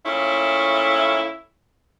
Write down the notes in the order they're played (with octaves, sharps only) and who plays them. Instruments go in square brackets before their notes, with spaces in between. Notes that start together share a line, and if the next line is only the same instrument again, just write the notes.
[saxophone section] A#2 A3 C#4 E4